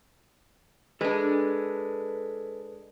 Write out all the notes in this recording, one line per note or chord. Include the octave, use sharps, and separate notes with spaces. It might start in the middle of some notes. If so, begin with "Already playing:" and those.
G#3 D4 A4 B4